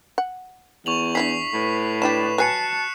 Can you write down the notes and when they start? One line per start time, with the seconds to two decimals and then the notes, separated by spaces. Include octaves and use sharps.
0.18 F#5
0.86 E2 C#6 F7 F#7
1.15 D4 E4 G#4 B6 C7
1.54 A2 B4
2.02 D4 E4 G4 B4 D5 E7
2.38 F#3 B4 G#5 A5 F#6 C7 C#7